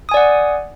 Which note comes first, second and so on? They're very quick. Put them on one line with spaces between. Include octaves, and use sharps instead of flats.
D#6 G#5 D5 F#5